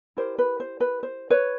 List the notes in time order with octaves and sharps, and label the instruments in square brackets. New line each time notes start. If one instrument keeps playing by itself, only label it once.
[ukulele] E4 G4 A#4 C5
B4
C5
B4
C5
B4 C#5